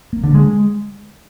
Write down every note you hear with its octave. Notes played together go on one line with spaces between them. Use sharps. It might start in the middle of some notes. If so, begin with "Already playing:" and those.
A#3
D3
G#3